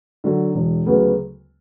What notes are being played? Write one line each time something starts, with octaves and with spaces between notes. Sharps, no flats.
D3 F#3
E1
D2 C#3 F#3 B3